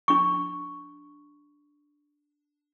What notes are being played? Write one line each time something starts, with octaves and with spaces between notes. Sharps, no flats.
D4 C#6